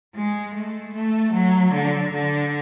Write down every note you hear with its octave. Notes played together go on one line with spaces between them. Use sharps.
G#3
A3
A3
F#3
D3
D3